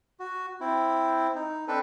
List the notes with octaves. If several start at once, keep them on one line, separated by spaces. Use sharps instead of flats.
F#4
C4 E4
D#4
C4 D4 A4 B4